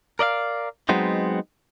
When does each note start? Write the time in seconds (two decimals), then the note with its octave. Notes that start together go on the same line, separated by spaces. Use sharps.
0.19 A#4 D5 D#5 F5
0.89 F#3 G#3 B3 C4 D#4